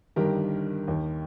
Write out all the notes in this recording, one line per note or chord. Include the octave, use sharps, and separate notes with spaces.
G1 G2 D#3 G4 A#4
D#2 D#3